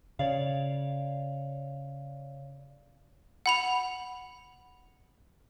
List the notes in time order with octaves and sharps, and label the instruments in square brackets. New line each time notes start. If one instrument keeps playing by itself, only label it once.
[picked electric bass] C#3 [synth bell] C#5 D5 F5
[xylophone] F#5 B5 F7